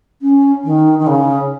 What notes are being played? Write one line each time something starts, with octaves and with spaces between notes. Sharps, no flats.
C#4
D#3
D#3
C#3